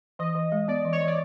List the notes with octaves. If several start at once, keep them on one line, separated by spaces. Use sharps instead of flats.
E3 D#5
E3
G#3
B3 D5
E3
C#5
E3
D5